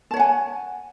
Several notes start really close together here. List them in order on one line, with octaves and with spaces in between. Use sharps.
A5 C#5 F#5 G#5